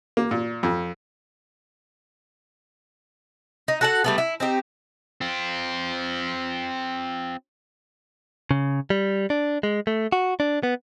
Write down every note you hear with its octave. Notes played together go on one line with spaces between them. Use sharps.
A#3
A#2
F2
D#4
F#4 A4 F#5
G3 A3 B3
E4
C4 D#4 G4
C4 F4
C#3
G3
D4
G#3
A3
F#4
D4
B3